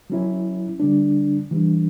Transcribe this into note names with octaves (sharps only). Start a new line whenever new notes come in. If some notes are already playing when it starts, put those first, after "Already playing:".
F#3 C#4 E4
D3 G3 D4
E3 G3 D4